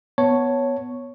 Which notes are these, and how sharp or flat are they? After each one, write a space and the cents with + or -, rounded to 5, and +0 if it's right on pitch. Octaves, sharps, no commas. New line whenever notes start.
B3 +0 C#5 +0 A5 +0